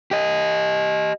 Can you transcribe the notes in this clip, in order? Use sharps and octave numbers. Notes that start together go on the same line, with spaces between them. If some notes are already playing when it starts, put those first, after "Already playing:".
G4 D#5